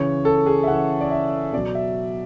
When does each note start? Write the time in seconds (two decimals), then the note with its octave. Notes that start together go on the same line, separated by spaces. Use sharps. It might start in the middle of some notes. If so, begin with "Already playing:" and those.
Already playing: C#3 E3 C#5
0.25 A4
0.46 G#4
0.63 E5
0.67 C#3 E3 F#5
1.01 D5
1.11 E5
1.53 B2 F#3 D5
1.75 E5